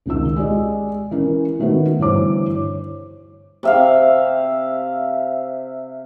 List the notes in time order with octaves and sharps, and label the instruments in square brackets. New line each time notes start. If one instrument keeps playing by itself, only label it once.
[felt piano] C#2 D#3 F4 E6
G#3 G4 D5 D#5
E3 C#4 A#4
D#3 A3 B3 F#4 B4
G2 D3 E3 C5 C#5 D6
C#5
[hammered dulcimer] C3 E5 F5